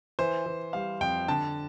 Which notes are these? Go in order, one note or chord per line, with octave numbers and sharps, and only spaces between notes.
E3 C5
E3
G3 F5
F2 G5
D3 A5